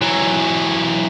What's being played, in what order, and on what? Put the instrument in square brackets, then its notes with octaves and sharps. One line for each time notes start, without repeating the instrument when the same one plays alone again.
[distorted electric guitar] E3 F#3